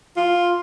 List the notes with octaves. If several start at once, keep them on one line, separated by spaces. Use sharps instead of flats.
F4